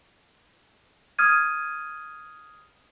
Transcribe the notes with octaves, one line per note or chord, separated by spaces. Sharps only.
D#6 F6 G#6 D#7